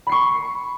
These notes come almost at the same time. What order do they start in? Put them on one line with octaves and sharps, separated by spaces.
B5 C7 C#6